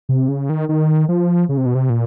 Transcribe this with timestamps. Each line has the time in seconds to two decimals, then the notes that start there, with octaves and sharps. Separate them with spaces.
0.09 C3
0.28 C#3
0.49 D#3
0.69 D#3
1.09 F3
1.49 C#3
1.57 C3
1.66 B2
1.75 C3
1.90 A#2